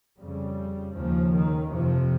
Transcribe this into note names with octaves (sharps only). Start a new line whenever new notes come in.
F2 C#3 G3
D#2 C#3 F3
D#3
F2 C3 F3